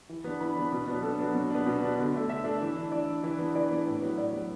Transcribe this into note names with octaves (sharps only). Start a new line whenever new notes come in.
E3
B3 D4
E3 B5
B3 D4
B2
F#3 B3 D4
B2 A4
F#3 B3 D4
B2
B3 D4
B2
B3 D4
D3
A3 D4
D3 E5
A3 D4
E3
D4
E3 D5
D4
E3
B3 D4
E3 D5
B3 D4 B4
A2
F#3 B3
A2 D5
F#3 B3